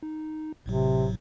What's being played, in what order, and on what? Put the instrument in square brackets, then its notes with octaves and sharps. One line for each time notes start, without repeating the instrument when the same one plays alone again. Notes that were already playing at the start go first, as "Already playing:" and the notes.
[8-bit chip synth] D#4
[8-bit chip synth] G#1 A2 F#3 [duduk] C3